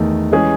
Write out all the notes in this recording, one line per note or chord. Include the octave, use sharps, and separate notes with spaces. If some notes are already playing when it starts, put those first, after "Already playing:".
Already playing: E2 D#3 A3
E3 G#3 C#4 G#4